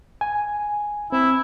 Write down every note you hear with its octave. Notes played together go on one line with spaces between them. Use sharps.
G#5
C4 E4